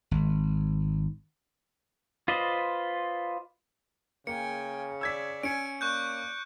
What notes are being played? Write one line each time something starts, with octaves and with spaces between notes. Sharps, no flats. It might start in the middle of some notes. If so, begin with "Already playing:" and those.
G#1
F4 B4 C5 D5 D#5
C#3 A#3 G5 G#5 C#7
D5 E5 E6 G#6 B6
C#4 G#5 C#7 D7
A#3 D5 C#6 F#6 G6